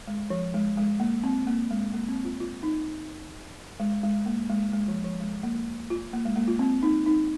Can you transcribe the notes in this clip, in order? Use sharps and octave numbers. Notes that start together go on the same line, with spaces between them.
G#3
F3
G#3
G#3
A#3
C4
A#3
G#3
A#3
C4
F4
F4
D#4
G#3
G#3
A#3
G#3
G#3
F3
F3
G#3
A#3
F4
A#3
G#3
A#3
F4
C4
D#4
D#4